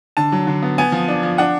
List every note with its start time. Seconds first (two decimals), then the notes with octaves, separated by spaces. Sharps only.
0.17 D3 A5
0.32 F#3
0.47 D3
0.62 B3
0.78 B3 G#5
0.92 F3
1.08 D4
1.23 F3
1.38 D4 F#5